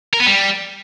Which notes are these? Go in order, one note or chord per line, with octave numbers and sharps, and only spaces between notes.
A#4
B3
G3